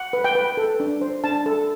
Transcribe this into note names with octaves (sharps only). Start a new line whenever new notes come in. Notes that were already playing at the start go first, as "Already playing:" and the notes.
Already playing: F#5
B4
G5
B4
A4
D4
C5
D4 A5
A4